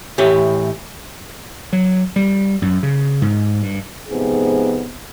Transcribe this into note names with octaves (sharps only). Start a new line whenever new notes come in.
A2 E3 G4 C#5
F#3
G3
F#2
C#3
G#2
G2
F2 G#2 C3 F3 B3 G#4